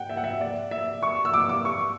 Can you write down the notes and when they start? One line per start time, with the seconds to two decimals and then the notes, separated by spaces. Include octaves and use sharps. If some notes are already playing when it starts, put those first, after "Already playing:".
Already playing: F#5 G5
0.09 E5
0.17 F#5
0.24 E5
0.41 D5
0.71 E5
1.03 C#6
1.25 E6
1.34 D6
1.49 D6
1.65 C#6